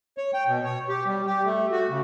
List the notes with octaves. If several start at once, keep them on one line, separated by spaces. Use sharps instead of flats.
C#5
G5
B2
C#5
G4
G3
G4
A3
F#4
C#3